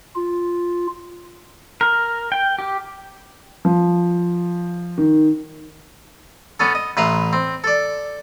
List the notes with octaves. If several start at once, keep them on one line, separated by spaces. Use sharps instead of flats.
F4
A#4
G5
G4
F3
D#3
B3 C#4 A4
D#5
A1 B4 E5 A#5 C6
C4
A4 D5